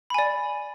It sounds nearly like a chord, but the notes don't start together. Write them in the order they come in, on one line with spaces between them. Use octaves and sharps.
B5 G#5 D5